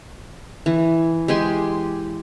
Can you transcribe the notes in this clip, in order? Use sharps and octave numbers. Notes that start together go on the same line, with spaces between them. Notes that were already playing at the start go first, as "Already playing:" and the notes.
E3
G#3 G4 G#5 C6